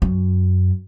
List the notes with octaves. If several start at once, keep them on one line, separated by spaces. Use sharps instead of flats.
F#2